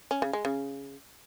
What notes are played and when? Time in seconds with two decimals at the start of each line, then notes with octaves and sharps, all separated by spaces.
0.11 C#4
0.22 C#3
0.33 G#3
0.45 C#3